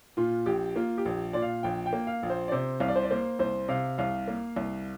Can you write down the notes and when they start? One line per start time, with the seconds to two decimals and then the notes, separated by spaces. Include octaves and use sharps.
0.17 A#2 F4
0.46 A#1 G4
0.76 A#3 F4
0.98 G4
1.05 A#1
1.33 A#2 D5
1.42 F5
1.63 A#1 G5
1.86 G5
1.93 A#3
2.07 F5
2.23 A#1
2.30 C5
2.48 D5
2.52 C3 C5
2.80 C2 F5
2.88 D5
2.96 C5
3.03 D5
3.11 A#3 C5
3.39 C2 C5
3.68 C3 F5
3.98 C2 F5
4.28 A#3
4.56 C2